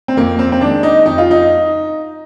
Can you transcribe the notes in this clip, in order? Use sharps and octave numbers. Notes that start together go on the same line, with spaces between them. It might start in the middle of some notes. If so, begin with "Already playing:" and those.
C4
F2 A#3
C4
C4
D#3 G#3 D4
D#4
F2 D#4
F4
D#4